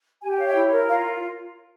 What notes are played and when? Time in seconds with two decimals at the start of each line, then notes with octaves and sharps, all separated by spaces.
0.22 G4 G#5
0.30 G5
0.38 C#5 F5
0.47 E5 G5
0.55 E4
0.71 A#4
0.88 F4 C#5 F5